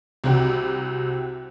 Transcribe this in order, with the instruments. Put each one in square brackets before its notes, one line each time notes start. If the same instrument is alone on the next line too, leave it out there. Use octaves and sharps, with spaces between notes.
[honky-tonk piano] C2 C3 F#4 G4